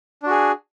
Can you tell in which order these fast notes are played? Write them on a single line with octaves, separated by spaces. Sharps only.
D4 F#4 G#4